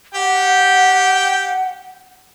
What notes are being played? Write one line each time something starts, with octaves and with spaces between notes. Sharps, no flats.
G4 F#5 G5